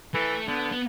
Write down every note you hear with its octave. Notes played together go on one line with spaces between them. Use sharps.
E3 A3
D3 B3
B3